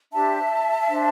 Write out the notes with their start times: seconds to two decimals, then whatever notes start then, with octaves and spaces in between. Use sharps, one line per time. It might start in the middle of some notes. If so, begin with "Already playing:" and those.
0.13 D4 G4 C5 E5 A5
0.88 D4 C5